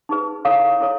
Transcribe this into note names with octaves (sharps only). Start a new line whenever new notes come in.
D#4 G#4 B4
E4 A4 C#5 F5
E4 A4 C#5